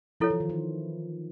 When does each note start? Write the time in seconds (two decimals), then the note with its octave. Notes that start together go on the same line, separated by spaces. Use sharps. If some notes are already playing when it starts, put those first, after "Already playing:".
0.20 F3 E4 A4 C#5
0.30 E3
0.40 D#3
0.49 E3